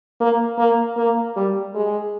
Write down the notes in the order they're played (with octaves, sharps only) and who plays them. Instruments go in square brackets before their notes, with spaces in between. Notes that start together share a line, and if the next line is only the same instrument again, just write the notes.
[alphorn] A#3
A#3
A#3
G3
G#3